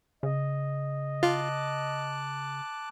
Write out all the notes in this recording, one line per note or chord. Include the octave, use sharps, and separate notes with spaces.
C#3 D#5
F4 A5 D6 F#6